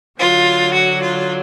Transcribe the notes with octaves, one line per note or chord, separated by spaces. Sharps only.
D3 F#3 F4
F#4
F4